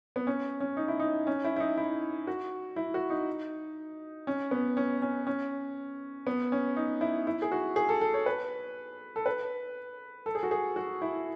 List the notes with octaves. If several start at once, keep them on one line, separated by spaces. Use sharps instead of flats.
B3
C#4
C#4
D#4
E4
D#4
C#4
E4
E4
D#4
E4
F#4
E4
F#4
D#4
C#4
B3
C#4
C#4
C#4
B3
C#4
D#4
E4
E4
G#4
F#4
G#4
A4
A4
C#5
B4
A4
B4
A4
G#4
F#4
G#4
F#4
E4